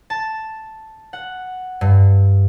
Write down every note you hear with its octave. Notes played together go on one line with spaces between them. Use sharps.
A5
F#5
G2